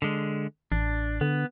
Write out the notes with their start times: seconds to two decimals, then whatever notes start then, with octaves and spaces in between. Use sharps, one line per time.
0.02 D3 G#3
0.72 A1 D4
1.21 D3 B3